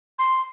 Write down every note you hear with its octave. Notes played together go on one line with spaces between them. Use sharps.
C6